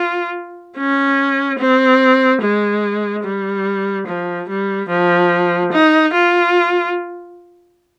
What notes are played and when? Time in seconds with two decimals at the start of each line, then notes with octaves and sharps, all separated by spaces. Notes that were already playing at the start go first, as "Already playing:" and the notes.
Already playing: F4
0.77 C#4
1.59 C4
2.42 G#3
3.24 G3
4.07 F3
4.49 G3
4.89 F3
5.72 D#4
6.13 F4